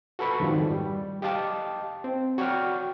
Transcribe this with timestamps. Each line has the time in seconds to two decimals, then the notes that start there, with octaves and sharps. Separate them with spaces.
0.19 F#4 A4 B4 B5 C#6
0.40 F2 G#2 D#3 F3 G3
0.71 G3
1.22 G4 D#5 F5 A5 D6
2.04 C4
2.38 F#4 C#5 D5 G5 C#6 F6